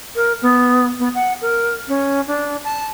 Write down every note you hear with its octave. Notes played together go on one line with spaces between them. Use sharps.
A#4
B3
B3
F#5
A#4
C#4
D4
A5